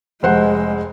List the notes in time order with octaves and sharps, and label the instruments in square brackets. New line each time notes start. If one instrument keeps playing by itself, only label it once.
[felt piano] F1 C5 F#5 [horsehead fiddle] G#3